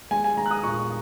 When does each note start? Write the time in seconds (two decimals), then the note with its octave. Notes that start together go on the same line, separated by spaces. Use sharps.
0.11 G#3 G#5
0.24 G#5
0.37 G#3 A#5
0.46 F#6
0.51 D#6
0.63 A#2 C#6